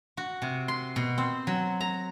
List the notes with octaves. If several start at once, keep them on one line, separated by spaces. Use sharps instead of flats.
F#4
C3
C6
B2
C4
F#3
A#5